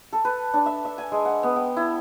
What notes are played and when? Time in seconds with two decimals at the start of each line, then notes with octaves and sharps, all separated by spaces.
0.13 A4
0.25 B4
0.54 D4
0.66 E5
0.85 E5
0.98 G#5
1.12 G#3
1.25 F#5
1.43 B3
1.56 G5
1.77 E4